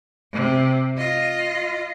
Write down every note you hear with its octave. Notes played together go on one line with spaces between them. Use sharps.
C3
F4 D#5